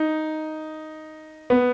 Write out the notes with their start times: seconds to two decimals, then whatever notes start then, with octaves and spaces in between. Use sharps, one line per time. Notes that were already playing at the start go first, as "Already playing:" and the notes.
Already playing: D#4
1.50 B3